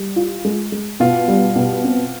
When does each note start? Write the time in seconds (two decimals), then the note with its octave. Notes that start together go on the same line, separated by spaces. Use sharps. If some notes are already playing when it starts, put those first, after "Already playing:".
Already playing: G3
0.16 F4
0.45 G#3
0.72 G#3
1.00 B2 F4
1.28 G3
1.56 B2
1.84 C4